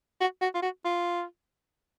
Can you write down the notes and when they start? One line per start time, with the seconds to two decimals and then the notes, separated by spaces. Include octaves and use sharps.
0.21 F#4
0.42 F#4
0.55 F4
0.62 F#4
0.85 F4